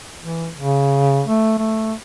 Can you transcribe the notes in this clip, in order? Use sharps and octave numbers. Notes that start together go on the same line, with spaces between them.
E3
C#3
A3
A3